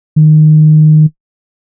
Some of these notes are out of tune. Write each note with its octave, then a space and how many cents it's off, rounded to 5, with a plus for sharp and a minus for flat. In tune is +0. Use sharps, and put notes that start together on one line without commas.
D#3 -15